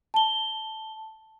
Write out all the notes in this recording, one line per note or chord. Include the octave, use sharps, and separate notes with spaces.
A5 G7